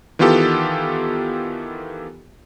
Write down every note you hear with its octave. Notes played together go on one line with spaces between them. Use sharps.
D#3 E3 B3 F4 G4 A4